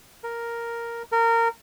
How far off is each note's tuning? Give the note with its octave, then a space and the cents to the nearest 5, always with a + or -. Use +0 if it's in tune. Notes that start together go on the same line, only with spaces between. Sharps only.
A#4 +0
A#4 -20